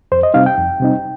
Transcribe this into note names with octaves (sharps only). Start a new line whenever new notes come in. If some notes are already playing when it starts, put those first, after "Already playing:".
F2 C5
D#5
C3 G3 C4 D#4 F5
G5
F2
C3 G3 C4 D#4